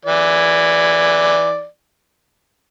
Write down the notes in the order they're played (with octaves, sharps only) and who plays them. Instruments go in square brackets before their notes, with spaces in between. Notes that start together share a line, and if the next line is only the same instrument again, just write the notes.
[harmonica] E3 D5